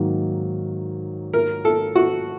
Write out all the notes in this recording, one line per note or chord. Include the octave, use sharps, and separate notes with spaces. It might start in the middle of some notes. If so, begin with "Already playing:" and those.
Already playing: G#2 D#3 F#3 A#3
A#4
A4
F#4